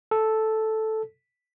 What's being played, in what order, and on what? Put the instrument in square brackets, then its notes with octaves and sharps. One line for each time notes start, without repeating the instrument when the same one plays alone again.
[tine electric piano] A4